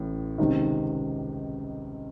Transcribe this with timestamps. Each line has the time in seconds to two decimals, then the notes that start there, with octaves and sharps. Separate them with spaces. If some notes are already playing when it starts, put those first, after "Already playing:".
Already playing: A1 A2
0.38 C#2 C3 D#3